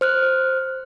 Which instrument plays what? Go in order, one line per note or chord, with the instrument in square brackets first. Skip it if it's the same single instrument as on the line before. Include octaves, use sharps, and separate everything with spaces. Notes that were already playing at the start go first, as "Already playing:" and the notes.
[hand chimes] C5 F6 F#6